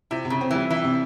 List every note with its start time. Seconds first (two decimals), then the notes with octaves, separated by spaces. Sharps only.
0.11 C3 E4
0.25 C3
0.30 C#3
0.41 C4
0.51 E3 G3
0.70 E3 E4
0.84 C3